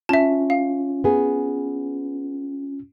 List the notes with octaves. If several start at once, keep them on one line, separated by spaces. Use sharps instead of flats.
C#4 F4 E5 A5
F5
B3 G#4